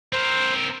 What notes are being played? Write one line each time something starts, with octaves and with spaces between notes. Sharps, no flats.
C4 A#4 C5